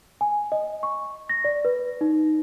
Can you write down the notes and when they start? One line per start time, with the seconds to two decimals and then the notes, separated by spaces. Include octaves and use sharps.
0.21 G#5
0.52 D#5
0.83 C#6
1.29 A#6
1.45 D5
1.65 B4
2.01 D#4